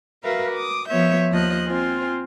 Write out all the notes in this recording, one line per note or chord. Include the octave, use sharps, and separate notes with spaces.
F#4 A#4 B4 E5 F5
D6 D#6
F3 B3 C#5 E5 G6
D#2 F3 D#5 F#6
C4 F4 C5 G#5